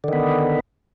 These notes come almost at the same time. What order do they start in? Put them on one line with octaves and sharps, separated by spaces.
D3 D#3 B3